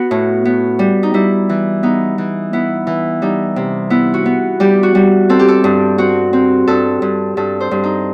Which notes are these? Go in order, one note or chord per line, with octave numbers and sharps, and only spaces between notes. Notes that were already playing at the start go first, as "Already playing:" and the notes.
Already playing: B3 F#4
A2
B3
G3
D#4
G3 E4
E3
B3 D#4
E3
B3 E4
E3
G3 D#4
C3
B3 E4
F#4
B3
G3 G4
F#4
G3
C4 A4
G4
A4
G2
C4 F#4
C4
G2 A4
G2
G2 A4
C5
G2
D#4